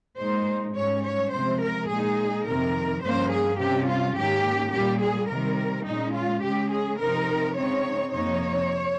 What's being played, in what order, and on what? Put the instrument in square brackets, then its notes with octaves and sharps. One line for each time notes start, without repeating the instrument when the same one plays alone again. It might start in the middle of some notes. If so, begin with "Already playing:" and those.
[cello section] A#2 G#3 D#4 C5
G#2 G3 C#4 C#5
C#5
C3 F3 G#3 C5
A#4
A#2 G#3 D#4 G#4
F2 C3 D#3 A#4
G2 F3 A#3 C#4 C5
G#4
C3 G3 C#4 G4
F4
G#2 D#3 A#3 C#4 G4
A#2 G3 A#3 G4
G#4
C3 D#3 G3 A#4
A#2 G#3 C#4 D#4
F4
C#3 G#3 C#4 G4
G#4
C3 F3 C4 D#4 A#4
C#3 G#3 C4 D#4 C#5
F2 C3 F3 A#3 D#4 C#5